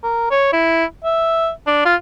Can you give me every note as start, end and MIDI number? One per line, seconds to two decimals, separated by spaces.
0.04 0.28 70
0.31 0.48 73
0.53 0.85 64
1.05 1.50 76
1.67 1.82 62
1.86 1.95 65